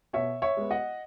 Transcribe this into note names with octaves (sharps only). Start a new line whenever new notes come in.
B2 C#5 E5
C#5 E5
G#3 B3
D#5 F#5